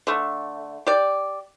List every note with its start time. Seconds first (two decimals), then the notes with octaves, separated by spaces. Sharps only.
0.07 D3 A3
0.87 G4 D5